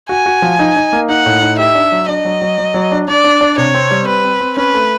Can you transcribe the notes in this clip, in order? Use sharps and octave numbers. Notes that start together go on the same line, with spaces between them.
F#4 G#5
F#4
F3
D#4
D#4
A#3
D#4 F#5
A2
D#4
G4 E5
D4
F#3
D4 D#5
F#3
F#3
F#3
F#3
D4
D4 D5
D4
D4
C3 C#5
C4
G3
C4 B4
C4
C4
C#4 B4
A3